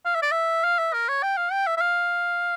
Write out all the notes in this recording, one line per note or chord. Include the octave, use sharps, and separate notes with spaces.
F5
E5
D5
E5
F5
E5
A#4
C#5
G5
F5
G5
E5
E5
F5